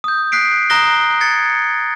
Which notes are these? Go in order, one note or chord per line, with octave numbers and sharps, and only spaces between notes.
D#6 G6
D#6 F#6 B6 C7 D7
A#5 D#6 F#6 A#6 G7
G#6 A6 C#7